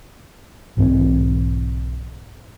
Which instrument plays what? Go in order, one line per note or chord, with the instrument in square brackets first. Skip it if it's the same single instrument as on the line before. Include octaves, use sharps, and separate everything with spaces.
[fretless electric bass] B1 G#2 E3 C4